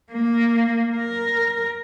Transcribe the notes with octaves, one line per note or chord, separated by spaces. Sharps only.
A#3
A#4